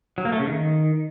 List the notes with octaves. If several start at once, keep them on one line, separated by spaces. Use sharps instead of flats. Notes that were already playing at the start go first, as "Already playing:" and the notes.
F#3
A#3
A3
C#3
D#3